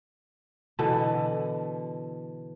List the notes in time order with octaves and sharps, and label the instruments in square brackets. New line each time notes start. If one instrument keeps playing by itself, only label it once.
[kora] B2 D3 E3